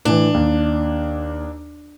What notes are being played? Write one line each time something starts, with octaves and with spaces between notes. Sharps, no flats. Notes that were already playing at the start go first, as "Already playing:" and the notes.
A2 E3 D4
D#2